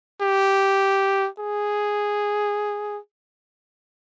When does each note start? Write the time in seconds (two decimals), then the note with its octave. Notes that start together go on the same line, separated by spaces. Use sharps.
0.22 G4
1.39 G#4